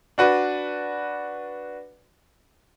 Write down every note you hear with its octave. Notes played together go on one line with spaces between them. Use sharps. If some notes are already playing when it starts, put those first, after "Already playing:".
D4 F#4 B4 D5